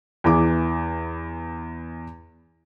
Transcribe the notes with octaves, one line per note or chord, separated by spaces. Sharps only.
E2 E3 D6